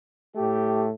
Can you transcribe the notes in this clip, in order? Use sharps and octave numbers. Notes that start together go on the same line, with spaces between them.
A2 A3 G4